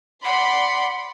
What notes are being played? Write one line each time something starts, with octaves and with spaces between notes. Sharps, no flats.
D5 F#5 B5 C6